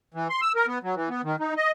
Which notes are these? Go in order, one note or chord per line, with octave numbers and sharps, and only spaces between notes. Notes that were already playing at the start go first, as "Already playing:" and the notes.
E3
C6
E6
A#4
B3
F#3
E3
B3
D#3
D#4
D#5